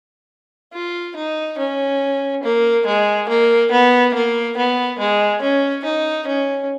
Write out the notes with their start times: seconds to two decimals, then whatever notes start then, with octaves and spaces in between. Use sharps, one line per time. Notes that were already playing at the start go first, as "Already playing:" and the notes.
0.73 F4
1.16 D#4
1.58 C#4
2.43 A#3
2.86 G#3
3.29 A#3
3.71 B3
4.14 A#3
4.57 B3
4.99 G#3
5.41 C#4
5.84 D#4
6.27 C#4